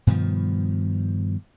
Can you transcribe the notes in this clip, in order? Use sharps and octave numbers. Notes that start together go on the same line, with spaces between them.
G2 B2 D#3 F3